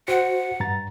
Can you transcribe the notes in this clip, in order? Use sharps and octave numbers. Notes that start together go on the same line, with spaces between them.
F#4 C5 F#5
G2 A#5 A6